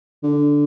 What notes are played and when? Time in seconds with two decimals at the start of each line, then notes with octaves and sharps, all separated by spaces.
0.24 D3